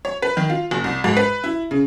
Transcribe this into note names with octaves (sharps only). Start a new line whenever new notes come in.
C#5
B4
D#3
F4
F#1
C2
G#2
B4
E4
C#3